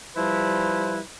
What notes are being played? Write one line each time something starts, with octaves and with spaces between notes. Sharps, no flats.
F3 G3 E4 B4